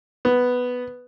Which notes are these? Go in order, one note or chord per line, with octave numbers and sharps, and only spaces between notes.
B3